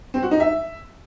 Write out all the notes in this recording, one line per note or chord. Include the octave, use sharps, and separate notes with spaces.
C4
F#4
D#4
E5